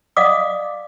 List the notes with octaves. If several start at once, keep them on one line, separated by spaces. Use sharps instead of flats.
D5 D#5 F5 F#5 D6 D#6